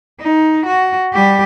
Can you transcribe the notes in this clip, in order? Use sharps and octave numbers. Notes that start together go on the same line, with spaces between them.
D#4
F#4
G3 G4